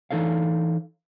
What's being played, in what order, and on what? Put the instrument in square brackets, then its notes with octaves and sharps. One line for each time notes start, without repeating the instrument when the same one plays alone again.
[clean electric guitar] E3 D#4 A4 C#5 F5